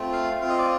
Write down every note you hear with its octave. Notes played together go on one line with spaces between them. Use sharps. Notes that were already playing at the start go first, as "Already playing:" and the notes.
Already playing: A3 C4 F4
F5
C4 F4 F5
D#5
D5